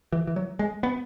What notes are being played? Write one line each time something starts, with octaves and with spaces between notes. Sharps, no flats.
E3
E3
F#3
G#3
B3